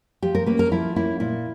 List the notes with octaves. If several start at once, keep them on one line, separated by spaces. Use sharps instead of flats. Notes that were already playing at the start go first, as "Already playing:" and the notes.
F3 G4
A#4
A#3 C#4 B4
A#4
F3 E4
A#3 C#4 E4
A#2 E4